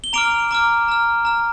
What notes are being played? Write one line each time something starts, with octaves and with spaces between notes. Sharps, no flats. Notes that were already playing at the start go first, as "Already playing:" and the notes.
G7
A#5 D6 F6 D7 F7
A#5 D6 F6
A#5 F6
A#5 F6